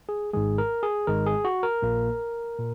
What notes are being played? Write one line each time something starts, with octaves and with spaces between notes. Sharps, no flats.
G#4
G#1 G#2 D#3 G#3 G#4
A#4
G#4
G#1 G#2 D#3 G#3 A#4
G#4
F#4
A#4
A#1 A#2 A#3
A#2